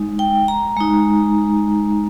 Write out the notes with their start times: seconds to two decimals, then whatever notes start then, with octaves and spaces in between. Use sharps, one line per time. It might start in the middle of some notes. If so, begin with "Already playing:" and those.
Already playing: G#3 D#4
0.19 G5
0.48 A#5
0.77 G#3 D#4